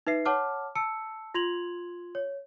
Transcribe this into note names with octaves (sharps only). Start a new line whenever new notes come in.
D#4 B4 E5 C7
C#5 F#5 A5 D6 F6
A5 E6 C#7
F4 C6 G#6 F7 F#7
C#5